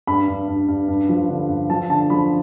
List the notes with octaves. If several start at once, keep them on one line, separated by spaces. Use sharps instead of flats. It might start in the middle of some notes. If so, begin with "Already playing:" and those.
G2 B5
G2
G2
G2
G2
F3
D3
G2
F3 A5
D3 A5
F3 B5